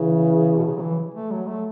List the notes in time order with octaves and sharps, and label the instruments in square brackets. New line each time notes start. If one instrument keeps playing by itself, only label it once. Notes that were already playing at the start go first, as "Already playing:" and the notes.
Already playing: [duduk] C#3 [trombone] E3
[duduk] B2
C#3
F#3
E3
A3
F#3
A3